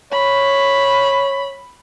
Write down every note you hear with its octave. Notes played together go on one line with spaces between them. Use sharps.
C#5 B5